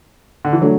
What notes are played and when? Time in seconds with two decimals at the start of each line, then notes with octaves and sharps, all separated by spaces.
0.45 D3
0.53 E3
0.61 D3 F#3 A3 D4 F#4